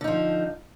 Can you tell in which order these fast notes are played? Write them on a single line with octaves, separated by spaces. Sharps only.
D3 D#4 F3